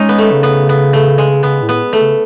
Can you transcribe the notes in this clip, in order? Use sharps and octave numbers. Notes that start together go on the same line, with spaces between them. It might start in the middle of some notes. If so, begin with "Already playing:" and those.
Already playing: G#3 C#4 D#4
B3
A3
C#3
B3
B3
A3
G#3
C#3 B3
A2
B3
A3
C#3